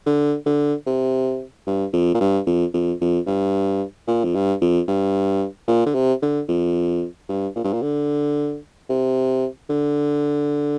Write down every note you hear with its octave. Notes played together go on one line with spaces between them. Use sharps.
D3
D3
C3
G2
F2
A#2
G2
F2
F2
F2
G2
A#2
F2
G2
F2
G2
A#2
D3
C3
D3
F2
G2
A#2
G2
A#2
D3
C3
D3